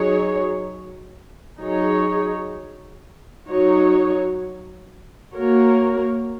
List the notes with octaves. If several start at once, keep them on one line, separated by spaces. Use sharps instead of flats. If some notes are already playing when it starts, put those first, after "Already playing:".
Already playing: F#3 D#4 G#4 C#5
F#3 D#4 G#4 C#5
F#3 D#4 F#4 C#5
A#3 F#4 A#4 C#5